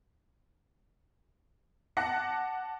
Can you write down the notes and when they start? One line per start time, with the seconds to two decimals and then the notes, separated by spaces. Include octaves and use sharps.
1.97 F#5 A5 D6 F#6 A#6 C#7